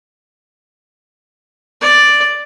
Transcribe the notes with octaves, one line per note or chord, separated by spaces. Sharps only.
D5